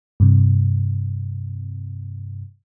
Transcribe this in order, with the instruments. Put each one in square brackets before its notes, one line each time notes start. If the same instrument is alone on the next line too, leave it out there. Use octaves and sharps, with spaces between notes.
[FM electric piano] G2 C3